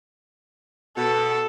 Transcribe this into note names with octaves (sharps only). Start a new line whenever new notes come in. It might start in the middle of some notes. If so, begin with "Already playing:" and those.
B2 A4